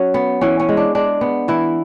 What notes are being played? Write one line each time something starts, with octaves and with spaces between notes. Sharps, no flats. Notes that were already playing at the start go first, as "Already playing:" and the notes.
Already playing: F#3 C#4
B3
E3 C#4
C#4
G#3
D4
G#3 D4
B3
E3 E4